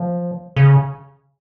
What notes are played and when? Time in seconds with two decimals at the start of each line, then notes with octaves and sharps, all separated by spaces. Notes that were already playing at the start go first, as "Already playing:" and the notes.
Already playing: F3
0.56 C#3